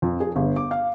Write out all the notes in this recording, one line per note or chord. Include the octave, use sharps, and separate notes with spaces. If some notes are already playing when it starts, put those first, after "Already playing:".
F2
G#4
G1
D6
F5